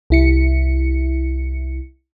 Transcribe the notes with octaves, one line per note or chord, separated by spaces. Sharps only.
C2 E4 C#7